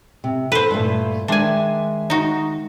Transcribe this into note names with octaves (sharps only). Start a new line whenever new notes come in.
C3
A4 B4 C5
G2 A#2 A3
D#3 G#3 D4 E5 G#5
D#4 F#4